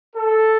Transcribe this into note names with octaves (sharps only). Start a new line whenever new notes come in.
A4